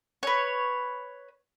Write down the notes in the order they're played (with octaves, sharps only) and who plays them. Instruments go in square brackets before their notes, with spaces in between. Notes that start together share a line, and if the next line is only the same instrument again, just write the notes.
[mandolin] B4 C#5